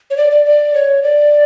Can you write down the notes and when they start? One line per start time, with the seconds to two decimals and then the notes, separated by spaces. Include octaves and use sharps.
0.10 C#5
0.17 D5
0.31 D5
0.45 D5
0.74 C#5
1.03 D5